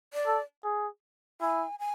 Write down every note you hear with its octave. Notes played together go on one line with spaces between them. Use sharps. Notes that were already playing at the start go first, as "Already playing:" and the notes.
D5
A4
G#4
E4 G#5
G#5